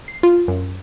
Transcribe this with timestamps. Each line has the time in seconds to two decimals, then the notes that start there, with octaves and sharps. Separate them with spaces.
0.08 C7
0.23 F4
0.48 F#2